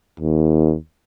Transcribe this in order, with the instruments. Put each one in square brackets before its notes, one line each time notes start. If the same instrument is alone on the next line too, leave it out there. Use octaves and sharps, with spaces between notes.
[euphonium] D#2